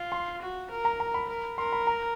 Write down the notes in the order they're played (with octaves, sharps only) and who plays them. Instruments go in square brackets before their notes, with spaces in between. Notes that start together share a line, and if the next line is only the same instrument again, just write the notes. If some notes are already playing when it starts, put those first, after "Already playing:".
Already playing: [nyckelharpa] F4
[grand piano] C6
[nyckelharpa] F#4
A#4
[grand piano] A#5
A#5
B5
[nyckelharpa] A#4
[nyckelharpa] A#4 [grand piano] C6
[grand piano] B5
A#5